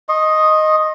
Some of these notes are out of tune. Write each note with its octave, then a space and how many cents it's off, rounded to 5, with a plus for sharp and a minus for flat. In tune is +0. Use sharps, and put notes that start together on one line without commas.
D#5 +0 C6 +45